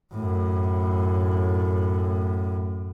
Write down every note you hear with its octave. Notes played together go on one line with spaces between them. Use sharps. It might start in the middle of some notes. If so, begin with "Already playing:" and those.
F#2 A2